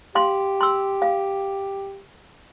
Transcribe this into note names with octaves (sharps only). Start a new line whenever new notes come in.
G4 F5 C6
C6 E6
F5